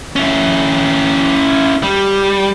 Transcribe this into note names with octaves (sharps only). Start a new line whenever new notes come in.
C#4 E4
G3